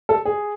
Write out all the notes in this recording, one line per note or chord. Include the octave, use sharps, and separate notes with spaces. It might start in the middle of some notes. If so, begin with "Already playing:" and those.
A4
G#4